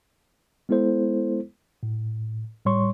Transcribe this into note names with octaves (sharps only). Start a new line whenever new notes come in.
G#3 B3 E4 A4 C5
A2
A2 G3 C#5 C6 C#6